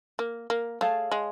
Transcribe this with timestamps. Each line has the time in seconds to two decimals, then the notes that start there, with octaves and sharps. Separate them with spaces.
0.19 A#3
0.50 A#3
0.81 A3 G#4 C#5 F5 A5
1.12 G#3